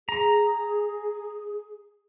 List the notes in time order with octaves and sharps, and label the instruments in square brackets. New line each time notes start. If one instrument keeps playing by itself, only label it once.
[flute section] G#4 [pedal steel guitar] A#5